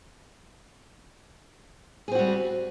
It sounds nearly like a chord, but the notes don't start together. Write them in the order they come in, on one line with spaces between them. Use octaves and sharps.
G#4 C4 F#4 G3